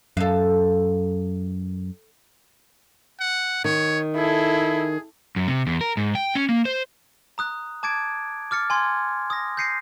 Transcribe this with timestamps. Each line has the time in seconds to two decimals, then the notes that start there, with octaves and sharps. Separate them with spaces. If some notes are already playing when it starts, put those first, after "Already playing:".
0.17 F#2 A4 F5
3.20 F#5
3.65 D#3 C#5
4.16 E4 G#4 A4
5.36 F#2
5.48 C3
5.67 E2
5.81 A#4
5.97 G#2
6.15 G5
6.35 C#4
6.49 A#3
6.65 C5
7.38 A#5 D#6 F#6
7.83 A5 D6 G#6 A6 D7
8.51 D6 F6 A6 C#7
8.70 G#5 C6 G#6
9.30 D#6 A#6
9.57 G6 A#6 C7 C#7 D#7